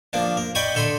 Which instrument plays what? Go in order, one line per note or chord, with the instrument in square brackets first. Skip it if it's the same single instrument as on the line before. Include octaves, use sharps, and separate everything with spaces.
[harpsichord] F3 A#3 D4
A#4
D5 D#5 G5 B5 C#6 D#6
D3 A4 B5 C6 D#6